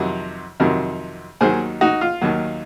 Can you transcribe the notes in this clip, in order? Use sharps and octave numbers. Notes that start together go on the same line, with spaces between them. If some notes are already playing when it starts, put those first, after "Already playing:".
Already playing: F2 C3 D#3 F#3
F2 C3 D#3 F#3
D#2 D#3 F#3 G#4 C5
D#4 F#4
F4
D#2 D#3 F#3